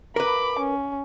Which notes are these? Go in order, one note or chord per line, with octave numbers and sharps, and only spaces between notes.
A#4 B4 B5 D6
C#4